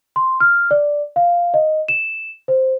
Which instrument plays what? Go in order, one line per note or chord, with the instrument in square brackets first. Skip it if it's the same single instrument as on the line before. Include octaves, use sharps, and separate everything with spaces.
[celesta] C6
F6
D5
F5
D#5
E7
C5